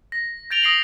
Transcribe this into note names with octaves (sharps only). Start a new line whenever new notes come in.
A#6
G6 A6 D7 F7 G7
D#6 A#6 C7 D7 F7 F#7